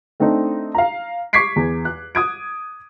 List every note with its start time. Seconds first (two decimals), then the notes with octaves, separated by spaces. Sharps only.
0.20 A3 C4 D4 D#4
0.75 F5 A#5
1.33 C#6 D6 G#6 B6 C7 D7
1.56 E2
1.85 F#6
2.15 D#6 G#6 D7